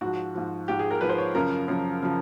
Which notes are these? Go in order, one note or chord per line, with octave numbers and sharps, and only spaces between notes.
G#2 F3 F#4
G#2 F3
G#2 F3 G4
G#4
A#4
G#2 F3 B4
C5
C#5
F#2 C#3 F3 A#4
F#2 C#3 F3
C#3 F3